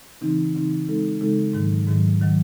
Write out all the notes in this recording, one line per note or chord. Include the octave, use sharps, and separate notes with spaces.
C#3 E3 C4 D#4
C#3 E3 C4 D#4
C#3 G#3 C4 D#4 A4
C#3 G#3 C4 D#4 A4
G#2 D#3 F#3
G#2 D#3 F#3
D#3 F#3